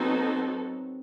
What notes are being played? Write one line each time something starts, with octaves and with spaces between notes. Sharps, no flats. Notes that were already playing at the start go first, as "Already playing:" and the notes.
Already playing: F#3 B3 C4 D#4 F#4 A4